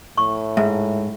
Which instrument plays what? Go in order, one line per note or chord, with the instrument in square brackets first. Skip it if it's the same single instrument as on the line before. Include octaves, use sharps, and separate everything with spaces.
[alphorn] A2 [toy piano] C#6
[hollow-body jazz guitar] G#2 [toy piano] E5